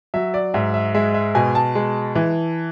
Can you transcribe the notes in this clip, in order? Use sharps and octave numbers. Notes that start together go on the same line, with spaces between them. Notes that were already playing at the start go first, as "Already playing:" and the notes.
F#3 E5
D5
G#2 E5
E5
G#3 E5
E5
B2 G#5
A5
G#3
E3